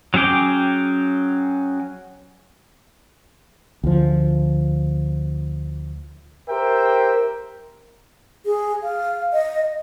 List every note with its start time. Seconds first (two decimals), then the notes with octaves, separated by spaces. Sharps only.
0.14 F#3 C#4 G#4 G5 D6
3.84 D2 F3
6.49 G4 A#4 C5 E5 G5
8.46 G#4
8.83 F5
9.33 D#5